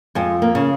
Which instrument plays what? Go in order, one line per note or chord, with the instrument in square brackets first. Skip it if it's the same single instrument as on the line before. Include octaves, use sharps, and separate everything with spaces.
[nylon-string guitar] F2 G#3
A#3
C#3